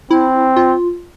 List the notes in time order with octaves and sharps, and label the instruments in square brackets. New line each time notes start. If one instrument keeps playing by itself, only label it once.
[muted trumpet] C4 [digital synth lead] E4
[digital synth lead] F4